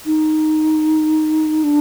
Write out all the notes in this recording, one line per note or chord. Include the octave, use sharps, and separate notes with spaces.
D#4
D4